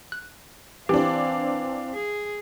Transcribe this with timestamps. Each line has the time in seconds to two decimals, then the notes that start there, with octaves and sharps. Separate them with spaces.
0.12 F#6
0.89 E3 C4 D4 G4 F5 G5
1.93 G#4